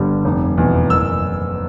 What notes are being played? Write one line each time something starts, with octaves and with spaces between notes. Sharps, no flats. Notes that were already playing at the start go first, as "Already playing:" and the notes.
Already playing: G1 G2 D3 G3
F1
E2 B2
F#1 E6